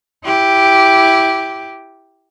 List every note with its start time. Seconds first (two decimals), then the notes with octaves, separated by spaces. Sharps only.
0.24 E4 G4